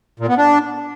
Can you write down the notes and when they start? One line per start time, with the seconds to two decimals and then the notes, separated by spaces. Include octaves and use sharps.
0.20 A#2
0.29 B3
0.38 D4